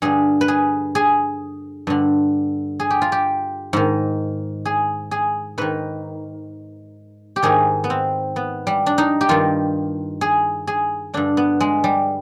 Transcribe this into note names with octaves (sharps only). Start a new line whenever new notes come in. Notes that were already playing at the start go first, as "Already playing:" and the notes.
G2 D3 G#4
B4
G#4
G#4
G2 D3
G#4
G4
F4
G4
G#2 D#3
G#4
G#4
G#2 D#3 B4
G4
G#2 D#3 G#4
B3
C4
B3
G3
D4
D#4
G4
G2 D#3 F4
G#4
G#4
G2 D3 D4
B3
G#3
G3